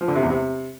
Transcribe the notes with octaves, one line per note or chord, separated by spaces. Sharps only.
F3
D3
C3
E2
C3